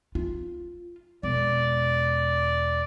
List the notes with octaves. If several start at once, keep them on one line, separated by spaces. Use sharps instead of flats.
F4
E1 D5